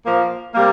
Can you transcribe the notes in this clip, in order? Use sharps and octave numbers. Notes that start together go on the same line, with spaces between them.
A#2 F3 A#3
C3 G3 A#3